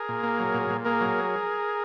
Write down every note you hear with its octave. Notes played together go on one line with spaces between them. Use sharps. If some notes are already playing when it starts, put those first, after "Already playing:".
Already playing: G#4 A#4
A#2
A#3
F#3
A#2
A#2
A#3 G#4 A#4
F#3